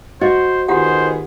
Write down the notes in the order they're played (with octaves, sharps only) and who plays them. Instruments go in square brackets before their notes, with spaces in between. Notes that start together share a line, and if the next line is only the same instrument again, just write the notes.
[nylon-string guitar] F#4 [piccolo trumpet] C5 [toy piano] D#5
[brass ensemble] D#3 B3 G#4 [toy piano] F4 G4 F#5 [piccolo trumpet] C5